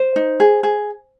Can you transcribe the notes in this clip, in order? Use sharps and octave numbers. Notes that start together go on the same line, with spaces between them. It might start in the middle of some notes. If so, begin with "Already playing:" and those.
Already playing: C5
D#4
G#4
G#4